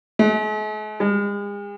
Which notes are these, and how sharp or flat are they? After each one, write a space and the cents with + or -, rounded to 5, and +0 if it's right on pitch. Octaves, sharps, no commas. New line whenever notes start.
G#3 +45
G#3 -40